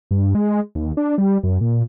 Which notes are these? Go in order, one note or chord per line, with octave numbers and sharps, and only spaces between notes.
G2
G#3
D#2
D4
G3
F#2
A#2